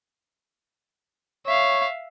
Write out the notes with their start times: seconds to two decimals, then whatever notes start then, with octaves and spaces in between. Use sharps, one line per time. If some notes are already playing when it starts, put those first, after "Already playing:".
1.46 C#5 E5 F5